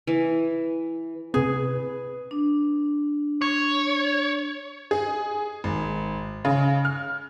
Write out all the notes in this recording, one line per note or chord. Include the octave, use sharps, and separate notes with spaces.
E3
C3 C4 G#4 B4
D4
C#5
G#4
G#1
C#3
F6